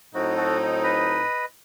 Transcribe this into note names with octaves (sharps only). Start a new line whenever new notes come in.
A2 F#3 C4 D#4 F#4
F#4 A4
B4 D#5